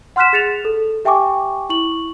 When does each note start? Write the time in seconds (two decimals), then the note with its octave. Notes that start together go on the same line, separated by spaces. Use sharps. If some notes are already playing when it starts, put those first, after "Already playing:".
0.16 F#5 C6 F6 F#6 B6 E7
0.33 G#4 A6 C#7 E7 F7
0.65 A4
1.05 G4 E5 G5 G#5 C#6 D6
1.69 E4 C#6 F#7